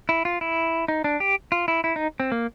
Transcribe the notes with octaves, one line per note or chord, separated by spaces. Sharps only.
E4
F4
E4
D#4
D4
G4
F4
E4
E4
D#4
C4
A#3